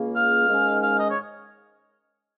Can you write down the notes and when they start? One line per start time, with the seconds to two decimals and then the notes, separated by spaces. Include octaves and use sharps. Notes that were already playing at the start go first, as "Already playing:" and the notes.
Already playing: C#2 C#3 A#3
0.13 F5
0.47 G#2 D#3 G#3 C#4
0.81 F5
0.98 D#5
1.10 C#5